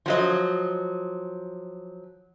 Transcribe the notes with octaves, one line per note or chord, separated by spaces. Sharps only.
F3 F#3 D#5